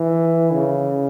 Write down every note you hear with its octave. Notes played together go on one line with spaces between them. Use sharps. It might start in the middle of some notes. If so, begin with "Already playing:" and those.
Already playing: E3
C#3